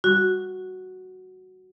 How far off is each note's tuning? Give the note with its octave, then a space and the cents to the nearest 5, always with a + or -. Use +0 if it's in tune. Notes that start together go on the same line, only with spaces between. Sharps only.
G3 +0 F#4 +0